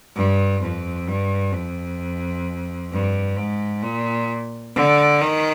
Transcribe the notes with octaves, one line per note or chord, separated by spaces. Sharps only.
G2
F2
G2
F2
G2
G#2
A#2
D3
D#3